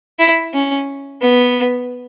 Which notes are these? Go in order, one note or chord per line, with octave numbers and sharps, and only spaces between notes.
E4
C#4
B3